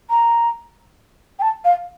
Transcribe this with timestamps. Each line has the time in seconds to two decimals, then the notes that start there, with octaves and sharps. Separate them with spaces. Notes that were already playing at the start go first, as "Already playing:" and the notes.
0.10 A#5
1.39 G5
1.42 A5
1.65 F5